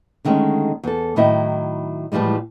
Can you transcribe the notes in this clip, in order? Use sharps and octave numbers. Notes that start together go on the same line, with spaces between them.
D3 D#3 G#3 A3 C#4
E2 A4
A2 D#3 F#3 E4 D#5 E5
A2 E3 F3 G3 G#3